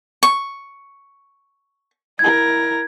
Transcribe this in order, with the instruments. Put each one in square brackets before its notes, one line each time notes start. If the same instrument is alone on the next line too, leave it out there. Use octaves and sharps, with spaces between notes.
[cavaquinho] C#6
[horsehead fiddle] E4 A#4 [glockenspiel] G#6